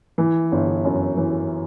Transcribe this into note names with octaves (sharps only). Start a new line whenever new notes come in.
E3
G1
F#2
E3